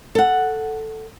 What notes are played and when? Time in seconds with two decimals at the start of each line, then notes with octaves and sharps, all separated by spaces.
0.15 A4 F#5